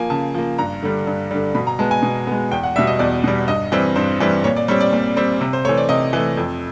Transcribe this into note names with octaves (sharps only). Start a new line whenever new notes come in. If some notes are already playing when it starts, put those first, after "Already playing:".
Already playing: F3 A#3 G#5
C#3 A5
F3 A#3
G2 A#5
D3 G3
G2
D3 G3
B2 B5
A#5
G#3 B3 A5
G#5
B2
G#3 B3
E2 G5
F#5
B2 G3 E5
D#5
E2 D5
B2 G3
G2 D#5
E3 G3 C4
G2 C5
E3 G3 C4
A#2 C#5
D5
G3 C4 C#5
D5
A#2
G3 C4
C3
C5
E3 A3 C#5
D5
C3 D#5
E3 A3
F2